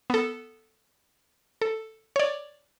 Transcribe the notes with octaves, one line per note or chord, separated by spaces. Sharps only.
B3 A4
A4
C#5 D5